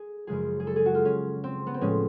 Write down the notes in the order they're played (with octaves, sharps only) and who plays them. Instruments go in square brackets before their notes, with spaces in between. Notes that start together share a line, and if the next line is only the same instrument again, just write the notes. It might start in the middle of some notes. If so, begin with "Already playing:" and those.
Already playing: [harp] G#4
F#2 C#3 F3 G#3 G#4
G#4
A4
G#4
F#4
F4
C#4
C4
B3
C4
A2 F3 G#3 C#4